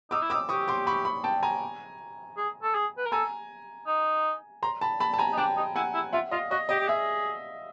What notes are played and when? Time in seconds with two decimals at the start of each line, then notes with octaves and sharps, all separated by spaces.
0.11 D#4 D6 E6
0.22 E4
0.30 D6 E6
0.34 D#4
0.49 G4 C#6 D#6
0.68 C6 D6
0.87 B5 C#6
1.05 B5 C#6
1.24 G5 A5
1.43 G#5 A#5
2.37 G#4
2.63 A4
2.75 G#4
2.98 B4
3.06 A#4
3.12 A4 G#5 A#5
3.87 D#4
4.63 A#5 C6
4.81 A5 B5
5.00 A5 B5
5.14 A5
5.18 G#5 A#5
5.33 D#4
5.38 D4 G5 A5
5.57 D#4
5.75 E4 F#5 G#5
5.94 E4
6.13 F4 E5 F#5
6.31 F4 D#5 F5
6.51 F#4 D#5
6.69 G4 D#5
6.79 G4
6.88 G#4 E5